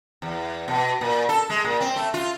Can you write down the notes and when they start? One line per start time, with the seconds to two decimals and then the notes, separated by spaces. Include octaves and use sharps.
0.22 E2
0.68 B2
1.01 A#2
1.29 A4
1.49 G#3
1.64 A#2
1.80 C4
1.96 A3
2.14 F4